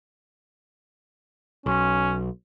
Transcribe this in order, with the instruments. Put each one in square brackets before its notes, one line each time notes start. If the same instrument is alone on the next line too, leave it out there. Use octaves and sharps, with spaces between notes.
[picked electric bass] B1 [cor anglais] C#4